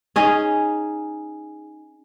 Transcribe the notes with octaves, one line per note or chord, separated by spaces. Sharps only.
C#4 D#4 G#4